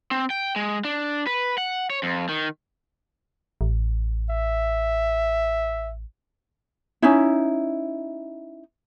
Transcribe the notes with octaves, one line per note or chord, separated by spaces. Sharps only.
C4
G5
G#3
D4
B4
F#5
C#5
F2
D#3
A1
E5
C#4 D#4 E4